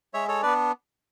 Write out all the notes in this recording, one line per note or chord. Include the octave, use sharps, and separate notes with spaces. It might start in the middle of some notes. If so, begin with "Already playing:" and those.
G#3 C#5 E5
A4 C#5
B3 D4 B4 D5